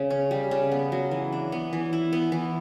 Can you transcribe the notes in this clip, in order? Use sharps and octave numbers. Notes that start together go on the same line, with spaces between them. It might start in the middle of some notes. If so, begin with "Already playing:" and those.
Already playing: C#3
C#4
G3
C#3
B3
F#3
E3
D4
B3
E3
E4
B3
E3